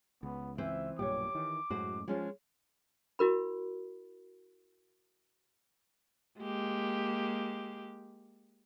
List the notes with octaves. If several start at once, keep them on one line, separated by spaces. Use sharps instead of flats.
C#2 B3
E3 C4 C5 E5
B1 G2 A#2 G4 C#5 D6
D#3 E3
F#2 A2 G#3 F#4 C5
F3 G#3 C#4 F4
E4 F#4 A#4 B5
G#3 A#3 G4